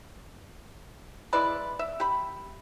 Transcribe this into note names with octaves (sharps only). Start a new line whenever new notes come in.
G#3 E4 B4 D5
E5
G4 B5